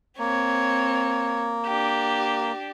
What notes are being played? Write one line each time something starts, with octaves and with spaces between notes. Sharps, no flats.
A#3 C4 C#5
D4 G4